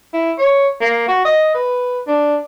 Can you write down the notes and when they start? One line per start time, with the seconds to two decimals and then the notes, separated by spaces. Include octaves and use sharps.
0.13 E4
0.39 C#5
0.81 A#3
1.08 F#4
1.25 D#5
1.54 B4
2.07 D4